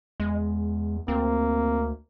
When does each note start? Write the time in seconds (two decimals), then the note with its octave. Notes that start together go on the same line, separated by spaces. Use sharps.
0.20 E2 G#3
1.08 D2 A#3 C4